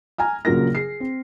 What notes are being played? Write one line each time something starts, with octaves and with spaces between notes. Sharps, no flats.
G#5 A#5 F6
A#1 C#3 F#3 F4 A#4 A#6
G#4 C7
C4